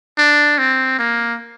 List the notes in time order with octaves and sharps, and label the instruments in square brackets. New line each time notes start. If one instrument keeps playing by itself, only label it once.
[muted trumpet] D4
C4
A#3